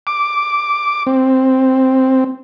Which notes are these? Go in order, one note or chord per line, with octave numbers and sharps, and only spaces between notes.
D6
C4